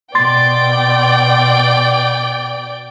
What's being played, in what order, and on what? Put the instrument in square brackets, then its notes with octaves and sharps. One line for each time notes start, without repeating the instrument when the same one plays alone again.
[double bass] B2 [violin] D5 G5 [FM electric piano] C6 A6